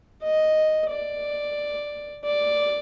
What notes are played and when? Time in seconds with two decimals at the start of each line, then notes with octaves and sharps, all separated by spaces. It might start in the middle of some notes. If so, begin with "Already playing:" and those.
0.23 D#5
0.90 D5
2.25 D5